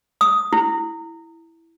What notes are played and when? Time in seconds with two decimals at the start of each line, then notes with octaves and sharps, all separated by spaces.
0.21 D#6
0.53 E4